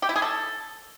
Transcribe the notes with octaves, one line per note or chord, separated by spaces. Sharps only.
G4
E4
G#4
A4